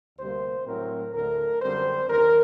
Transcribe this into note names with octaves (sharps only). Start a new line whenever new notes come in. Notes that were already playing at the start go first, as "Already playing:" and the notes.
D2 C3 G3 A#3 C5
A2 F#3 A3 C4 A#4
D2 D3 A3 A#4
F#2 D3 G3 C4 C5
D#2 D3 A#4